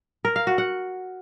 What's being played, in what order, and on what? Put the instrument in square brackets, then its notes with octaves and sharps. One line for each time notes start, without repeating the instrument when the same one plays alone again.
[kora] A#4
F5
F#4
F#5